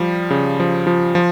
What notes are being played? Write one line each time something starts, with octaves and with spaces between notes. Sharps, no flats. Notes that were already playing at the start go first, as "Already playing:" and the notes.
Already playing: F3 G3
C#3
F3
F3
F3